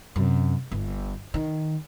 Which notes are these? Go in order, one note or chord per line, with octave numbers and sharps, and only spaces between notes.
F#2 C3
G1
D#3